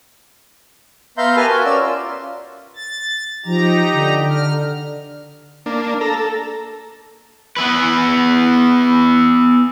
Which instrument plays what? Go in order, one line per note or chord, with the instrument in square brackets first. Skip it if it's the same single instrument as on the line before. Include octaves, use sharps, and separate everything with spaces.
[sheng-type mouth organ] B3 E5 F5 A#5 C6 G6
G4 A#4 B4 G#5 A5 F6
F#4 A#4
C#4 D5 E6
F4
[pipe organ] A6
[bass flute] F3 [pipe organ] D#4 G4 A#5
[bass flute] D3
[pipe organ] F6
[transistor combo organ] A#3 D4
A4 A#5
A4
[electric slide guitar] B3 E4 B4